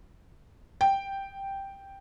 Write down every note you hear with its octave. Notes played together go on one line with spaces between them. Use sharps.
G5